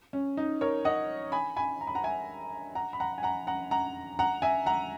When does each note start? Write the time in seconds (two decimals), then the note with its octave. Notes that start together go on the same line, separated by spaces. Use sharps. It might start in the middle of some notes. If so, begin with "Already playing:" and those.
0.13 C#4
0.37 D#4
0.61 A#4 C#5
0.85 D#5 F#5
1.32 G#5 B5
1.56 G#5 B5
1.81 A#5
1.87 B5
1.95 F#5 A#5
2.04 E5 G#5
2.75 F#5 A#5
2.93 B5
3.00 F#5 A#5
3.18 G#5
3.23 F#5 A#5
3.47 F#5 A#5
3.71 F#5 A#5
4.19 F#5 A#5
4.42 E5 G#5
4.66 F#5 A#5